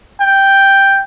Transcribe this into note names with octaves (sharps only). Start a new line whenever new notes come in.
G5